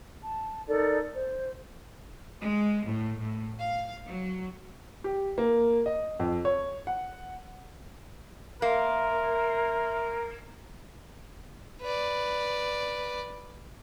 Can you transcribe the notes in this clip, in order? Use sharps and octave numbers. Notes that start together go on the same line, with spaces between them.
A5
D#4 A4 A#4 D5
C5
G#3
A2
A2
F5
F#3
G4
A#3
D#5
F2
C#5
F#5
A#3 A#4 E5 C6
B4 D5